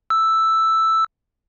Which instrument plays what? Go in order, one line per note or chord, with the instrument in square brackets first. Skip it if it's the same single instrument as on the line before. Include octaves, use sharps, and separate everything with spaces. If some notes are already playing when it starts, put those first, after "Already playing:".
[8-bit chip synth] E6